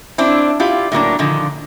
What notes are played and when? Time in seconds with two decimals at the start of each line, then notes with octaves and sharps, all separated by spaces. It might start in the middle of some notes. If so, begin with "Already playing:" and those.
0.18 C4 D4 E4
0.60 E4 F4 G4
0.92 A2 F#3 A#3 D4
1.19 A#2 D3 D#3 F3